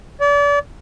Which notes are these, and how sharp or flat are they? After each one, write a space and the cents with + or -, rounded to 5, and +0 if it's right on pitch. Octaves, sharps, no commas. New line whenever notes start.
D5 -35